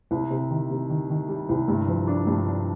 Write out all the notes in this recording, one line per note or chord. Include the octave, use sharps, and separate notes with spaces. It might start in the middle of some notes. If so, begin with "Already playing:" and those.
C2
C3
D#3
C3
D#3
D#3
G3
C2
G2
F3
D4
G2
D4